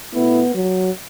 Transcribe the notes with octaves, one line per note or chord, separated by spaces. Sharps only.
B2 A3 B3 E4
F#3